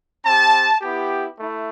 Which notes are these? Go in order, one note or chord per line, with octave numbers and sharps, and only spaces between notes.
C4 G4 A5
B3 E4 G4
A3 E4